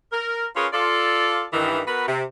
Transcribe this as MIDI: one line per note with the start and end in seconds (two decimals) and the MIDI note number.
0.12 0.46 70
0.56 0.67 61
0.56 0.67 65
0.56 0.67 68
0.56 0.67 70
0.56 0.67 71
0.56 0.67 73
0.73 1.44 65
0.73 1.44 69
0.73 1.44 74
1.53 1.80 43
1.53 1.80 51
1.53 1.80 52
1.87 2.04 59
1.87 2.04 66
1.87 2.04 70
1.87 2.04 71
2.07 2.23 48